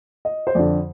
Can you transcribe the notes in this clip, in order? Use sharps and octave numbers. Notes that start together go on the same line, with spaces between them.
D#5
C5
F2 D3 D5